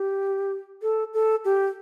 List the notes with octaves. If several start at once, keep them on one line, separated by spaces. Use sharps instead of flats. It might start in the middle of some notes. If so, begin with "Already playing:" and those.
Already playing: G4
A4
A4
G4